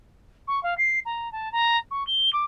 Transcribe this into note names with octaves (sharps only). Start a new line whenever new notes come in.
C#6
F5
C7
A#5
A5
A#5
C#6
G7
D6